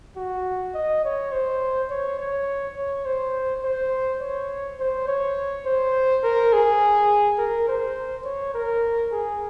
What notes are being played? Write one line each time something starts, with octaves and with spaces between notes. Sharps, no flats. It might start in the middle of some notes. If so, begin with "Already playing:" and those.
F#4
D#5
C#5
C5
C#5
C#5
C#5
C5
C5
C#5
C5
C#5
C5
A#4
G#4
A#4
C5
C#5
A#4
G#4